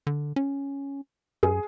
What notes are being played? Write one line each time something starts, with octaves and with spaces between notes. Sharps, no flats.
D3
C#4
F#2 G#4